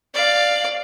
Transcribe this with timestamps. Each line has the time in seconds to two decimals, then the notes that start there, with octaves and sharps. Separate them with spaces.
0.14 D5 F5